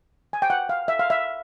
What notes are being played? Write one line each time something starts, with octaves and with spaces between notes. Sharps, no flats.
G#5
G5
F#5
F5
E5
F5
E5